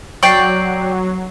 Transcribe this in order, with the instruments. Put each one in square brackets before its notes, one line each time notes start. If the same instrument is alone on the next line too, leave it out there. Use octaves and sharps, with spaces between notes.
[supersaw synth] F#3 [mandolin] D5 G5 [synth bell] C#6 C7